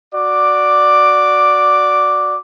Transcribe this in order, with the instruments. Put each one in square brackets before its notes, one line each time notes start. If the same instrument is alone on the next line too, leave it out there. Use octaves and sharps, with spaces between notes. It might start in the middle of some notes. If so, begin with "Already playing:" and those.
[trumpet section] F#4 D5 D6